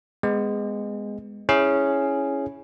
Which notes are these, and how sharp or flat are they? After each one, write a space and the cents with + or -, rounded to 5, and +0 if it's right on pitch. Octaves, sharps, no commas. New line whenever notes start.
G#3 -10 B3 +20
C#4 +0 E4 +0 G#4 +0